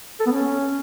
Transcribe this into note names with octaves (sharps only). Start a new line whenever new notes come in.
A4
B3
C#4